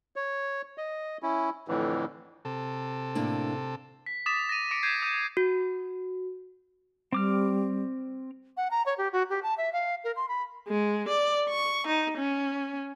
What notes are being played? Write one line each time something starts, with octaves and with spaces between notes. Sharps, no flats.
C#5
D#5
C#4 E4
F2 A2 D3 E3
C3 A4
A2 A#3 D4
B6
D6 D#6 A6 B6 E7
A#6 D#7
D6 A#6 C#7 D7
G6 G#6 B6 C7 D#7
D#6 G6 D#7
F#4
G3 C4 D6 F6
F#5
A#5
C#5
G4
F#4
G4
A5
E5
F5
A#4
C6
B5
G#3
D5
C#6
D#4
C#4